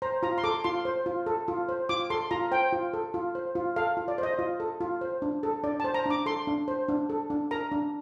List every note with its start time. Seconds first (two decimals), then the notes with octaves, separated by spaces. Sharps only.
0.02 C5 A#5
0.23 F4 A#5
0.38 C6
0.44 A4 D6
0.64 F4 C6
0.85 C5
1.06 F4
1.26 A4
1.48 F4
1.69 C5
1.89 F4 D6
2.10 A4 C6
2.31 F4 A#5
2.52 C5 G5
2.72 F4
2.93 A4
3.14 F4
3.35 C5
3.55 F4
3.76 A4 F5
3.97 F4
4.08 D5
4.18 C5
4.23 D#5
4.39 F4
4.60 A4
4.81 F4
5.01 C5
5.22 D4
5.43 A4
5.64 D4 D5
5.80 C5 A5
5.94 A#5
6.06 D4 D6
6.26 A4 C6
6.47 D4
6.68 C5
6.88 D4
7.10 A4
7.30 D4
7.51 A#4 A#5
7.72 D4